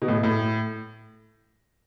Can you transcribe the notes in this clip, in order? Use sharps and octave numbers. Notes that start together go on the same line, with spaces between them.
B2
A2
A2